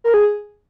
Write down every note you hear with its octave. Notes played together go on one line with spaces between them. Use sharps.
A#4
G#4